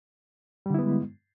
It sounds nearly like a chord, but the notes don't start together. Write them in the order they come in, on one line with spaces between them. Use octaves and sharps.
G3 D3 E4 B3 G#3